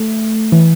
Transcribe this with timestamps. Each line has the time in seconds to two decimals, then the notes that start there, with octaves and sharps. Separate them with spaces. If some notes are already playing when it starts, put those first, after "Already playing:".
Already playing: A3
0.52 E3